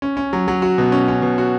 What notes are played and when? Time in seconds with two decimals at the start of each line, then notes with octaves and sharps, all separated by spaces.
0.02 C#4
0.17 C#4
0.33 F#3
0.48 F#3
0.62 F#4
0.78 B2
0.92 C#4
1.08 C#4
1.22 B2
1.38 F#4